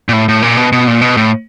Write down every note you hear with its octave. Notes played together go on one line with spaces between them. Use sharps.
A#2
A2
A2
A#2
B2
B2
A#2
B2
A2